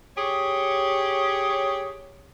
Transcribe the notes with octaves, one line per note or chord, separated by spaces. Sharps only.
G4 G#4 C#5